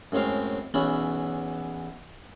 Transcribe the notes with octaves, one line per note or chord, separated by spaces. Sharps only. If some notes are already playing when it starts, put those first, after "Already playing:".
F#2 A2 G#3 C4 F5
B1 E2 B3 C#4 E5 B5